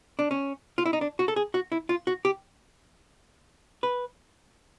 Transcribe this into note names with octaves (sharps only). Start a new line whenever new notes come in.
D4
C#4
F4
E4
D#4
D4
F#4
A4
G#4
F#4
E4
F4
F#4
G4
B4